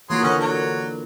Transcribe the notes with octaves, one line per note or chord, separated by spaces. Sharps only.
E3 F#3 A#3 F4 G#4 C6
D3 E3 C#4 B4 D#5 F#5
F#3